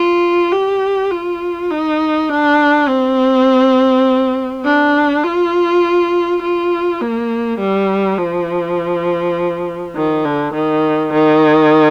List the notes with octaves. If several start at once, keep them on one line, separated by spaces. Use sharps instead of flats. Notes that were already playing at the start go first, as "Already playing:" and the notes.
Already playing: F4
G4
F4
D#4
D4
C4
D4
F4
F4
A#3
G3
F3
D#3
D3
D#3
D#3